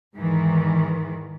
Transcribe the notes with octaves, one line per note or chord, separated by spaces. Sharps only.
E2 G#2 D#3 E3